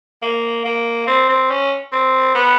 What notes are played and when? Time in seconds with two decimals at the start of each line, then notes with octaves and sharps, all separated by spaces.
0.22 A#3
0.65 A#3
1.07 C4
1.29 C4
1.51 C#4
1.92 C4
2.35 B3